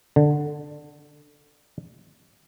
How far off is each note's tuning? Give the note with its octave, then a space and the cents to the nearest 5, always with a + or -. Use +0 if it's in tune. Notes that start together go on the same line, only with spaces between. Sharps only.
D3 +10